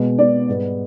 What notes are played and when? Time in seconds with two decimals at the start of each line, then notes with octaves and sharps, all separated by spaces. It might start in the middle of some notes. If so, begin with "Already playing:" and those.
Already playing: B2 G#3 B3
0.18 B2 G#3 B3 D5
0.49 G#2 G3 B3